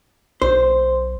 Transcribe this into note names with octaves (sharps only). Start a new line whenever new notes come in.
B1 C5